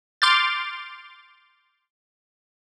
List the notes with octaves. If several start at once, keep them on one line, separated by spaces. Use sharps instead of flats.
C6 D6 F6 G6 A6